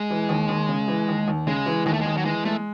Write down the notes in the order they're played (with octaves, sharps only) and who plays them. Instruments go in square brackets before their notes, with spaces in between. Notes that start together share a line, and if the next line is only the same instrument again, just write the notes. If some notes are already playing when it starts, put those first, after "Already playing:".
Already playing: [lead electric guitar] G#3
[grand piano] E3
D#2
D#2
C#3
E3
D#2
D#2
[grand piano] C#3 [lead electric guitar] G#3
[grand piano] E3
[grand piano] D#2 [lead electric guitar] G#3
[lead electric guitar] A3
[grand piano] D#2 [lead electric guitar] G#3
[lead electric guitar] F#3
[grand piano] E3 [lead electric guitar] G#3
[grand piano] G#3 [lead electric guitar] A3